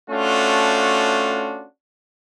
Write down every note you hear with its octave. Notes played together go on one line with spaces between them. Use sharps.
A3 C#4 D4 F4 F#4